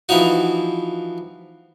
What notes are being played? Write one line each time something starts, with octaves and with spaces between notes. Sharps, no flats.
E3 F3 B3 D#4 F#4